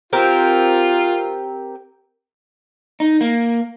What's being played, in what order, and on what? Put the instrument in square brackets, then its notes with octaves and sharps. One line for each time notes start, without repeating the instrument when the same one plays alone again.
[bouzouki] C4 G4 A#4 [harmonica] F4
[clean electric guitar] D#4
A#3